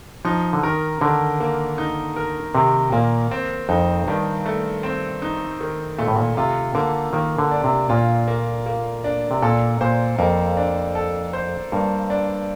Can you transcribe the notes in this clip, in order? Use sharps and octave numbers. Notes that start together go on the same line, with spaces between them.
F3 D#4
D3
D#3 A#4
D3 D#3
A#3
D#4
A#4
C3 D#3
A#2 A#3
C4
F2 D#4
G2 D#3
A3
C4
D#4
D#3
A#2 A3
A2
A#2
C3 F4
D3 A#3
D#3 A#3
D3
D4
C3
A#2 F4
A#3
A#3
D4
C3
A#2 A4
A#2 C5
F2 A#3
D4
A4
C5
G2 A#3
D4